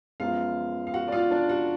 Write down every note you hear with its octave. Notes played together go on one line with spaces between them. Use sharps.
F#2 F3 G#3 B3 F4 F5
F5
F#4 F#5
D5
F4 F5
D4 D5
F#4 F#5